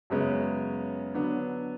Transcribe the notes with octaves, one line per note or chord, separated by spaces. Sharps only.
F#2 C#3 G#3 B3
D3 F#3 B3 D4